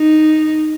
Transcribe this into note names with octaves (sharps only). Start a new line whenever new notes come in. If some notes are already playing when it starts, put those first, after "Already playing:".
Already playing: D#4